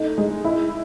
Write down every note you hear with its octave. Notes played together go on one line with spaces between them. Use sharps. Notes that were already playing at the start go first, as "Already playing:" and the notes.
Already playing: A3 D#4
G#3
E4